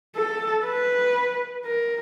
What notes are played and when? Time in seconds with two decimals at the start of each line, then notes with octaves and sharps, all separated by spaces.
0.16 A4
0.66 B4
1.66 A#4